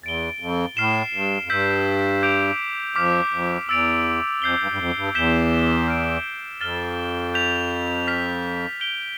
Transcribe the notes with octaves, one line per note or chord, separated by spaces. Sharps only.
E2 A6 D7 G7
F2
A2 F6 C7 E7 G7
G2
F2
G2 E6 G6 B6
D6 G6 D7 F7
F2 D6 F6 B6
F2
E2 E6 A6 D7 F7
F2 G6 C7 G7
G2
G2
F2
G2
E2 G6 B6 E7 G7
F6 B6 D7
F2 F6 A6 E7 G7
G6 B6 F7
F6 B6 F7
G6 D7 G7